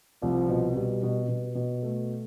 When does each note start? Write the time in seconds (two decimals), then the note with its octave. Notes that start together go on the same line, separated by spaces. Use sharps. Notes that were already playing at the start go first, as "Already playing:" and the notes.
0.22 C2 F3
0.49 B2
0.75 B2 G3
1.03 B2
1.28 B2
1.55 B2
1.83 A3